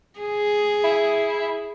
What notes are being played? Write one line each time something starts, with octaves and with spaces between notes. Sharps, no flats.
G#4
E4